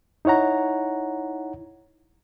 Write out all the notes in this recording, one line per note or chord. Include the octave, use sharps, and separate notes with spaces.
D#4 E4 C#5 F#5 A#5